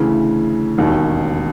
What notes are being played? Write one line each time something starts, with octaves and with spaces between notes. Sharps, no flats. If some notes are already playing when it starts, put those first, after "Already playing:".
Already playing: D2 C#3 E3
E1 D#2 D#3